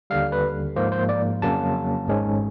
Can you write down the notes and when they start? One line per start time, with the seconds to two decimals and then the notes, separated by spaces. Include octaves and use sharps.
0.10 D#2 D3 G3 F5
0.32 B4
0.76 G#2 F3 A#3 C5
0.92 C5
1.09 D5
1.42 F2 C#3 F#3 A#3 C#4 A5
2.07 G#1 G#2 D#3 G#3 C#4